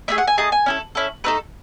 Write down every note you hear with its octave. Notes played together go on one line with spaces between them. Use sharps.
A3 D#4 G#4 E5
F#5
G#5
A3 D#4 G#4 A5
G#5
C#4 E4 A4
C#4 E4 A4
A3 D#4 A4 B4